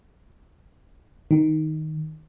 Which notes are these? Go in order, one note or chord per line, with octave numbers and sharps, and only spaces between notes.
D#3